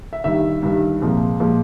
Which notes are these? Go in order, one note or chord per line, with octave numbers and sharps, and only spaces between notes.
E5
G2 D#3 G3 E5
G2 D#3 G3
C2 A#2 F3 G#3
A#2 F3 G#3